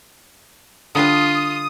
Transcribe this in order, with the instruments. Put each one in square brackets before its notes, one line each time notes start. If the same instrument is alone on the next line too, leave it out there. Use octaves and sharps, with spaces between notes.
[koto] D3 G3 D4 [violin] F4 [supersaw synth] D#6